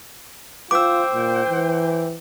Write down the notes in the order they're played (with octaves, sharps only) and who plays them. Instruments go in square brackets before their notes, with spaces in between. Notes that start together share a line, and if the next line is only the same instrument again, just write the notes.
[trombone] F4 [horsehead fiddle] C5 G5 [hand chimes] D6 E6
[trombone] A#2
E3